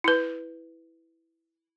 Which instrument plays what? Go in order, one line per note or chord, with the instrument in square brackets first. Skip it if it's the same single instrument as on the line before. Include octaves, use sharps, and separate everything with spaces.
[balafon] E4 B4